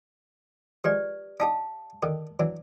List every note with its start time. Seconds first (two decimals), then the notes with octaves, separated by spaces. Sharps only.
0.84 F3 G#3 G4 B4 D5
1.40 D4 D#4 G4 F5 A5
2.03 D3 D#3 G4
2.40 E3 F#3 D4